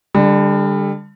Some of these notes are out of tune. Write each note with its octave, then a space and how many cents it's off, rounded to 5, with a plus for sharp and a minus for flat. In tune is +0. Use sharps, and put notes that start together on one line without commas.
D3 +0 G3 +30